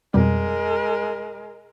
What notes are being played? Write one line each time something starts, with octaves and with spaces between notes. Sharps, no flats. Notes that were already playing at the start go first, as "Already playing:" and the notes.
F2 B2 G3 G#3 A#4